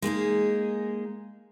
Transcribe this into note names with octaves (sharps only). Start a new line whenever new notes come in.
G#3 A#3 D#4 G#4